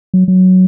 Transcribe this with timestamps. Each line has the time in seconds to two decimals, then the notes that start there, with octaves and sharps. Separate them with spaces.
0.14 F#3
0.28 F#3